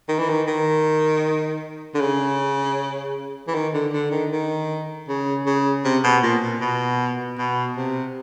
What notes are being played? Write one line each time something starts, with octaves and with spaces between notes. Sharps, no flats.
D#3
E3
D#3
D#3
D3
C#3
E3
D#3
D3
D3
D#3
D#3
C#3
C#3
C3
B2
A#2
A#2
B2
B2
C3